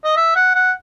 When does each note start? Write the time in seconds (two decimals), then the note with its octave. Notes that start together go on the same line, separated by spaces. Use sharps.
0.04 D#5
0.17 E5
0.36 F#5
0.55 F#5